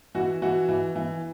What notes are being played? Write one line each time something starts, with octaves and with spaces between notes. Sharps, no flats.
E3 F#4
E3 F#4
E3
E3